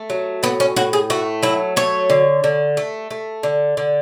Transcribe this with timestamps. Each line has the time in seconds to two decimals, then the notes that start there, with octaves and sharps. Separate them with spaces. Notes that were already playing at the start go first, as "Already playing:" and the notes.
Already playing: A3
0.10 F#3
0.43 A2 B3
0.60 C#4
0.76 A2 F#4
0.93 G#4
1.10 A3 F#4
1.42 F#3 E4
1.76 A3 C#5
2.10 D3
2.44 D3
2.77 A3
3.10 A3
3.43 D3
3.77 D3